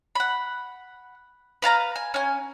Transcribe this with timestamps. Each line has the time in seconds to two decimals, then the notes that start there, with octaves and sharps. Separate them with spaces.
0.15 F#5 B5
1.62 B4 F5 A5 A#5
1.96 G#5
2.14 C#4 G#5